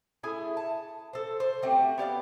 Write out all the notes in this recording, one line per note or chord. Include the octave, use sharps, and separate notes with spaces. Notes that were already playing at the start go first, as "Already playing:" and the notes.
A3 E4 G#4 G#5
A5
A4 C5
C5
A3 C4 F#4 G4
B3 G4 D5 F5